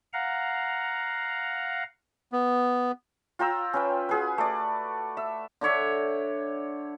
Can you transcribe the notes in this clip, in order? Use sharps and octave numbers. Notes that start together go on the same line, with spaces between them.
F5 F#5 A#5
B3
F4 G5 A#5 E6
C#4 B4 G5
F#4 G#4 B4
A3 D5
E5
D3 D4 C#5 E5